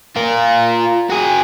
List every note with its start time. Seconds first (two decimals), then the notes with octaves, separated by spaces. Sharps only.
0.16 F4 A#4
1.10 F#4 G#4